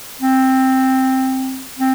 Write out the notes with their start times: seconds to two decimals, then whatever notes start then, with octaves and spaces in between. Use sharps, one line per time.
0.21 C4
1.79 C4